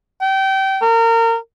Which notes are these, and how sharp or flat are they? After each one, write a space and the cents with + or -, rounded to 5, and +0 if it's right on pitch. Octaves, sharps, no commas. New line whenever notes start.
G5 -25
A#4 -30